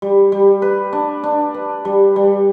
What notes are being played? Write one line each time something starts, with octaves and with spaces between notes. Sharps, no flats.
G3
G3
B4
D4
D4
B4
G3
G3